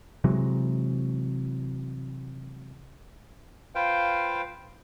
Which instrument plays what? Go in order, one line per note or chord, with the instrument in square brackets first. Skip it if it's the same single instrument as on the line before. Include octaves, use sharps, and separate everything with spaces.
[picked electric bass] C3 E3 F#3 G#3
[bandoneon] F4 B4 C5 F5 G5